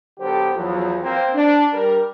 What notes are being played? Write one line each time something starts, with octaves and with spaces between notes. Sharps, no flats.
D3 F#3 B3 G4 A4 C5
E2 F3 F#3
A#3 C4 C5 G5
D4
G3 A#4